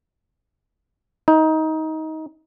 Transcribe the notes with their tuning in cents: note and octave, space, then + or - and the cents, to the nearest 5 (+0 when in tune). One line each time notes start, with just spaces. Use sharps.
D#4 +20